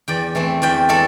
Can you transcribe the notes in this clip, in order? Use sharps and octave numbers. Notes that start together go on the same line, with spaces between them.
E2 D5 G5
E3 A3 C4
E2 D5 G5
E3 A3 A4 D5